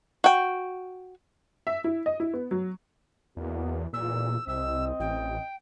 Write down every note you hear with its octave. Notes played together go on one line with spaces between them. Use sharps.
F#4 G5
E5
E4
D#5
E4
B3
F#3
E2 B2 A#3 B3
B1 E2 A#2 E6
C2 C4 D#5 E6
A1 G5